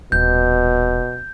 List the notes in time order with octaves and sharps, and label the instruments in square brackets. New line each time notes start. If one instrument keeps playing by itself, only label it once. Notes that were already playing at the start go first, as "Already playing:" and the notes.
[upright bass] D#1 [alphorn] B2 [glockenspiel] G6